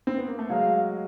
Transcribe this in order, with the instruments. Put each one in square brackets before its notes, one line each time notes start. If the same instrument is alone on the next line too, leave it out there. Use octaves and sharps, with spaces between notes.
[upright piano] C4
B3
A#3
A3
[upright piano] F#3 G#3 [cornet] F5